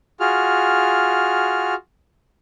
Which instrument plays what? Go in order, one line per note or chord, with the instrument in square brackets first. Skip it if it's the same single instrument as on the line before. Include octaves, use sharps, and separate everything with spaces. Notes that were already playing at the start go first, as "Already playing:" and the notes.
[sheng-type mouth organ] F4 F#4 G#4 F6